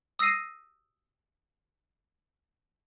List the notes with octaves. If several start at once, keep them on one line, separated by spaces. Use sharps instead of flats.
D#6 E6 A#6 C7 D#7